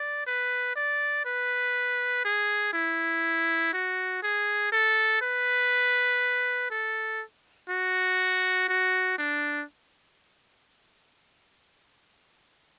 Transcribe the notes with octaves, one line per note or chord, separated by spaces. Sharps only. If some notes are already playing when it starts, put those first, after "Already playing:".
Already playing: D5
B4
D5
B4
G#4
E4
F#4
G#4
A4
B4
A4
F#4
F#4
D4